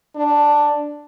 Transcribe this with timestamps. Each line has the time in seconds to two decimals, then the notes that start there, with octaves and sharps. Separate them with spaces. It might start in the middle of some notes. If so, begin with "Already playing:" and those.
0.16 D4